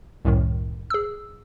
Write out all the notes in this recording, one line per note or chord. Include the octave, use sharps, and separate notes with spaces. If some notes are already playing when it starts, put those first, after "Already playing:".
C2 F#2 A2 D#3
G#4 E6